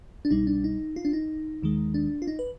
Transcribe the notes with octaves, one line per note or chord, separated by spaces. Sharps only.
D4
C2 B2 G3 D#4
D4
D#4
F4
D4
D#4
D#2 D#3 G#3
D4
F4
D#4
B4